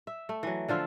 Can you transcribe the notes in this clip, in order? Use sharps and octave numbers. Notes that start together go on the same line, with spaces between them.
E5
A3
E3 F#3
D3 F3 F4 E5